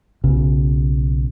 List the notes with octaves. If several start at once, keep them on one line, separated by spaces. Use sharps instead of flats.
B1 C#3